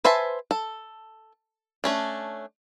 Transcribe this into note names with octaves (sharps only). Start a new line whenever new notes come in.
B4 C5 E5 G#5 A5
A4
A3 C#4 D4